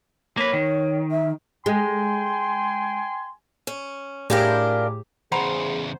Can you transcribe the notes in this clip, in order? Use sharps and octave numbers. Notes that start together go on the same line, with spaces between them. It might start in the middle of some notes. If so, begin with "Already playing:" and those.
A#3 B4 C#5
D#3
E5
G#3 G5 G#5 C6
C#4
A2 D4 F4 G4 G#4 A#4
E2 C#3 G#4 C5 F#5 A#5 B5